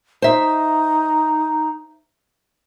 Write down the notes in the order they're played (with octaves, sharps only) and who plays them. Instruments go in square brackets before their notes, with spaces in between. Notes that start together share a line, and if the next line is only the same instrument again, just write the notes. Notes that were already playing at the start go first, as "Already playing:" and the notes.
[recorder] D#4 [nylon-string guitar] C5 E5